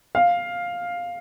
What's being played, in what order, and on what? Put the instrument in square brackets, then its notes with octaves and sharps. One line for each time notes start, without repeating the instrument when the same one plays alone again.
[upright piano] F5